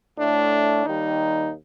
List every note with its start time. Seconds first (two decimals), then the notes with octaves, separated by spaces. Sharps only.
0.18 A2 A3 D4
0.84 D#2 D#3 G3 D#4